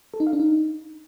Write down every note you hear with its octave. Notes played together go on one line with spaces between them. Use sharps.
A4
D#4
F5
D4
D#4